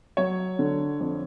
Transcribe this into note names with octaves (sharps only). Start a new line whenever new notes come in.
F#3 C#5
D3
F2